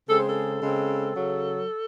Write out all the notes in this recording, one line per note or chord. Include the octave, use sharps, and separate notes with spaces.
C#3 G#3 C4 A4
C5
A4
C#3 G#3 C4
C#3 F#3